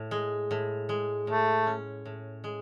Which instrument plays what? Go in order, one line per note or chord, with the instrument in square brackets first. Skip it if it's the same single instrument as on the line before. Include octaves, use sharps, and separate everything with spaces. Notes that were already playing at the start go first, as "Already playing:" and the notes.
Already playing: [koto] A2
G#3
A2
G#3
[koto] A2 [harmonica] A3
[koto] C#4
A2
G#3